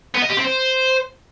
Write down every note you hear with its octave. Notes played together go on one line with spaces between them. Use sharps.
B3
D#5
G4
C4
C5